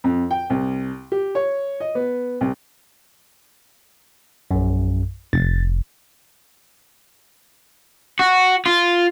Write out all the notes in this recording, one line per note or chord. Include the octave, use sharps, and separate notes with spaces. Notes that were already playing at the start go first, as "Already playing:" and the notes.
F2
G5
C2
G4
C#5
D#5
B3
C2
A#1 F#2
F1 A6
F#4
F4